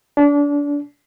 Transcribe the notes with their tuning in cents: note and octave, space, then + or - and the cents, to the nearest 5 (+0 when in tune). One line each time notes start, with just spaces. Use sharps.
D4 -30